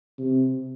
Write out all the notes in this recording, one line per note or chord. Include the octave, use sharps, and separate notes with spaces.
C3